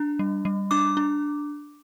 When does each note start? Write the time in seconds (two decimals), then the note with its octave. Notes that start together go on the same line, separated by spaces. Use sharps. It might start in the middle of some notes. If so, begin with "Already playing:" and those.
Already playing: D4
0.19 G3
0.45 G3
0.71 D4 D6
0.97 D4